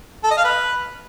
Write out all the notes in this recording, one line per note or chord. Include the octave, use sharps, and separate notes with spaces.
A4
D#5
F5
B4